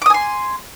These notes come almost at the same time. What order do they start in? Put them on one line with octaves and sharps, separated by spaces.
D6 D#6 G#5 C6